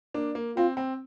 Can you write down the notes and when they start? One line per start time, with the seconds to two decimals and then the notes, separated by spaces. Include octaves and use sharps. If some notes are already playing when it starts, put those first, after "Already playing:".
0.14 A#3 D4
0.35 A#3
0.57 C4 F4
0.77 C4